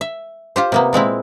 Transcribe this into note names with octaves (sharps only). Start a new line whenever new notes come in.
E5
F4 G4 C5
C3 A#3 B3
A#2 G#3 C4 E4